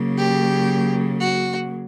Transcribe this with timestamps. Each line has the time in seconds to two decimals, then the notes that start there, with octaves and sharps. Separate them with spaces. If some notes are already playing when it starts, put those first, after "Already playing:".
Already playing: C#3 F#3 A#3
0.18 G4
1.20 F#4